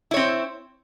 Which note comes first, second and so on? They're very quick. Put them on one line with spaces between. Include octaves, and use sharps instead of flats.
E4 C#5 C4